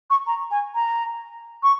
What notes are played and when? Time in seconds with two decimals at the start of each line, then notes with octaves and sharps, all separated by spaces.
0.10 C#6
0.27 A#5
0.51 G#5
0.75 A#5
1.63 C#6